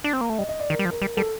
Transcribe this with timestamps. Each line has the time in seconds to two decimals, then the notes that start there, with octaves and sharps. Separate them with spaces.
0.04 D4
0.13 C4
0.21 A#3
0.30 A3
0.38 G3 D#5
0.49 D#5
0.60 D5
0.70 D#3 A#4
0.79 G3
0.85 F3
0.91 A#4
1.01 G3 A#4
1.17 G3 A4